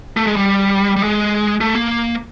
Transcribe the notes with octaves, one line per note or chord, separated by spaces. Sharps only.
A3
G#3
G3
G3
G#3
A3
A#3